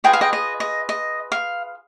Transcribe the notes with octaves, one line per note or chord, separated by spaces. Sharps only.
F4 G#4 B4 D#5 G5
F5
D#5 G5
D#5
D#5
D#5
F5